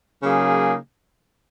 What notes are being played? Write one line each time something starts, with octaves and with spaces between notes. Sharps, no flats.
C#3 F#3 A#3 D#4 G#4